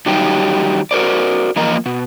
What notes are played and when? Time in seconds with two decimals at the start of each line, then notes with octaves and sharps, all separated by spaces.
0.06 D#3 F#3 G3 D#4 G4
0.91 F#4 A#4 C5 D5
1.56 E3 F3 A#3 A#4 D#5
1.86 B2